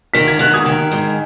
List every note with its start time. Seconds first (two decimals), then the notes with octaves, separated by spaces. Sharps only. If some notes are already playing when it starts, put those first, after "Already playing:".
0.14 D#3 B6
0.28 G#6
0.39 D#3 F#6
0.54 D#6 G#6
0.66 D#3
0.91 G#2